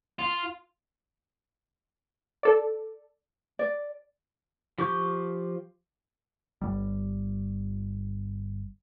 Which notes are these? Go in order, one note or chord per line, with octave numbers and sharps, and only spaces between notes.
F4
A4 D5
D5
F3 G4 C#6 D6 G6
G1 G3